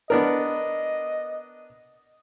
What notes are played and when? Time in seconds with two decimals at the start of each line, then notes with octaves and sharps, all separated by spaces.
0.10 B3 D4 A#4 D#5